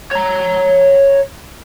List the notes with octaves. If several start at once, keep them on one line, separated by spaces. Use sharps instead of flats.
C#5 A#5